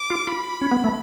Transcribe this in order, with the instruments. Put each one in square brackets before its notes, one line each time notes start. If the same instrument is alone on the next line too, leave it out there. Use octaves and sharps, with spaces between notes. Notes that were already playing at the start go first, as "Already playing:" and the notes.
Already playing: [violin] D6
[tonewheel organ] F4
[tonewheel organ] F4 [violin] B5
[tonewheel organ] C#4
B3
A3